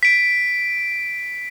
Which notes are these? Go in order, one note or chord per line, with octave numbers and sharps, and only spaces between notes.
B6 D7